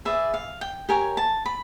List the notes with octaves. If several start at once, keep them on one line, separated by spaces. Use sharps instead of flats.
G#4 B4 D5 E5
F5
G5
G4 A#4 C#5 G#5
A5
B5